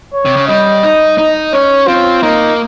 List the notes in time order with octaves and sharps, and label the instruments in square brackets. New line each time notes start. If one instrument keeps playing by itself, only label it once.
[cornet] C#5
[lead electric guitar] C3
C#3
[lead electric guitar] G3 [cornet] D#5
[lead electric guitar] D#4
D#4
[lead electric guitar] C#4 [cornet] C#5
[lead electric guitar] C4 [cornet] F4
[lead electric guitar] A#3 [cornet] D#4